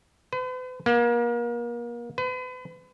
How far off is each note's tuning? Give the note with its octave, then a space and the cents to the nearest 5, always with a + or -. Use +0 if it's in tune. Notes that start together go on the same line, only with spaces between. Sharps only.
B4 +45
A#3 +35
B4 +40